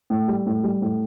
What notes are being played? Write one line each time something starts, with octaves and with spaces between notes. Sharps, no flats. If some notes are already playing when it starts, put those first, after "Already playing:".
A2
G3
A2
G3
A2